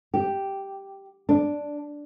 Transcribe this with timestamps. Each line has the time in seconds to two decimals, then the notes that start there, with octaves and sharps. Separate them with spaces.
0.14 G4
1.29 D4